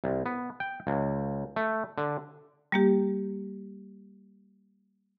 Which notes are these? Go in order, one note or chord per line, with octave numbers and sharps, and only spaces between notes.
C2
B3
G5
C#2
A3
D3
G3 A#3 G4